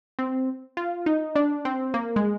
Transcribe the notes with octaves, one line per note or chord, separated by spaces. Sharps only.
C4
F4
D#4
D4
C4
A#3
G#3